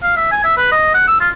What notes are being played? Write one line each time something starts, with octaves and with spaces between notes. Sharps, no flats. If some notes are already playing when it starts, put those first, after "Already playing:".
F5
E5
G#5
E5
B4
D#5
F#5
E6
F4